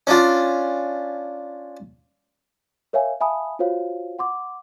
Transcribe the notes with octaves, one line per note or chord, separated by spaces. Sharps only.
C#4 D4 F4
A#4 C#5 E5 F5 G#5
E5 F5 G#5 A5 B5 D#6
F4 F#4 C5 C#5 F5
F#5 C6 D6